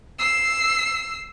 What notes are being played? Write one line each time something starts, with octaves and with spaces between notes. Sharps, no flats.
E6 C7